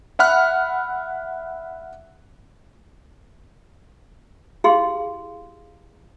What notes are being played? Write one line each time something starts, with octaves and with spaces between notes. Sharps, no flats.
E5 F#5 B5 F6 F#6
E4 G4 G#4 F5 C6